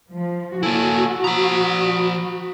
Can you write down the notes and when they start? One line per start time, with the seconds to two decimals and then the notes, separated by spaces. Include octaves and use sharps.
0.13 F3
0.63 A#3 E4 F#4 A4 G#5
1.24 F3 A#5 B5 D#6